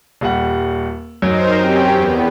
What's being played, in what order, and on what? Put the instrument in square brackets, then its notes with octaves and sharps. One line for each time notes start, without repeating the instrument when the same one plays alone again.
[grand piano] D#1 G3 F#5
[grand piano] F#2 F#3 [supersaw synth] D#4 A#4 C5
[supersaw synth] C4 C#4 G4
E2 B3